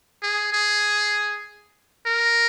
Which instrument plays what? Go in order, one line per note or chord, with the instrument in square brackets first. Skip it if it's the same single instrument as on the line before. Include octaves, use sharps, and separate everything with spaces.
[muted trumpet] G#4
G#4
A#4